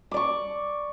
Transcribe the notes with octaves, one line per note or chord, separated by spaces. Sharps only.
D5 C#6 D6